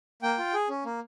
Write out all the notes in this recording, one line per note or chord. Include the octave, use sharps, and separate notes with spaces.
A#3 G5
F4
G#4
C#4
A#3